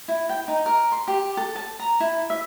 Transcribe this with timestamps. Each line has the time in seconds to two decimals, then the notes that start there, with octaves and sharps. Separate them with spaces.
0.08 E4
0.29 G5
0.48 D#4
0.66 A#4
0.92 C6
1.08 G4
1.37 A4
1.56 A5
1.79 A#5
2.00 E4
2.30 E5